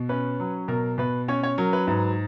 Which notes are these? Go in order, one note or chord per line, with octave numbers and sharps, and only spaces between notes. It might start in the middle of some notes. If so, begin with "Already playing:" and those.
Already playing: B2
C#4 B4
F#3
B2 A#4
B2 B4
C#4 C#5
C#5
F#3 A#4
B4
G#2 B4